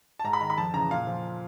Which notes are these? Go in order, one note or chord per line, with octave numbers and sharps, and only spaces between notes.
A5
G#2 A#5
B5
D#3 A#5
B5
F2 A5
C#3 E3 A#5
A#2 F5
F3